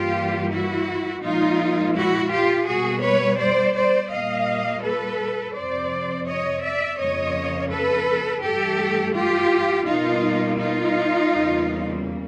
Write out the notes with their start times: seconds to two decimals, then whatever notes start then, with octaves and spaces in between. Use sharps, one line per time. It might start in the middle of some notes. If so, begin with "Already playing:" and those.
Already playing: G2 E3 G3 A#3 F4 G4
0.51 E4 F#4
1.23 A#2 F3 G#3 D#4 F4
1.95 E4 F#4
2.31 F4 G4
2.67 B2 G3 A#3 F#4 G#4
3.03 B4 C#5
3.39 C5 D5
3.75 C5 D5
4.11 A#2 G3 A#3 D#5 F5
4.83 A4 B4
5.55 F2 C3 F3 C5 D5
6.27 C#5 D#5
6.63 D5 E5
6.99 F2 C#3 F3 A#3 C#5 D#5
7.70 A4 B4
8.42 G2 E3 A3 G4 A4
9.14 F4 G4
9.86 B2 G3 A#3 D#4 F4
10.58 D#4 F4
11.31 E2 C#3 E3 G3 A#3